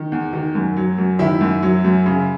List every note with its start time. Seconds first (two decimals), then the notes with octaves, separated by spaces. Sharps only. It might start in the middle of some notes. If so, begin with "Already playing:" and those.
Already playing: D#3
0.12 E2
0.33 D#3
0.55 F#2
0.77 F#3
0.98 F#2
1.19 D#3 E4 E5
1.41 F#2
1.63 F#3
1.85 F#2
2.06 C#3